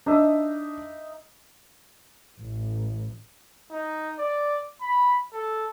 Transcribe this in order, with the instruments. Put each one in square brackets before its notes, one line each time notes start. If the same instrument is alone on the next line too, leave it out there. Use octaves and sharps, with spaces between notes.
[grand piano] D4 [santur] D#4 D#5 E5
[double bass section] A1
[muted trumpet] D#4
D5
B5
A4